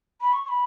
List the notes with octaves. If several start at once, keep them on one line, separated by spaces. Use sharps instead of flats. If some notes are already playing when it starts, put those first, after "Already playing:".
B5
C#6
C#6
B5